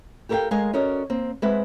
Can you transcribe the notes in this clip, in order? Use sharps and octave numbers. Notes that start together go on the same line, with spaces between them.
G4 A4 A#4 C#5 F5 G5
G#3 A#4 D#5 F5 G#5
C#4 F#4 A4 A#4 D5 D#5
A#3 C4
G#3 C4 B4 E5 F#5